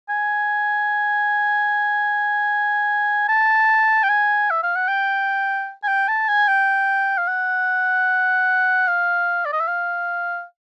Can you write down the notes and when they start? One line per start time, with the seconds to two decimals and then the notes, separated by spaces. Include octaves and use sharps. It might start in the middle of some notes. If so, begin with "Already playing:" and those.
0.09 G#5
3.28 A5
4.03 G5
4.09 G#5
4.50 E5
4.63 F5
4.75 F#5
4.88 G5
5.83 G#5
5.88 G5
6.08 A5
6.28 G#5
6.48 G5
7.18 F5
7.27 F#5
8.88 F5
9.45 D5
9.53 D#5
9.60 E5
9.67 F5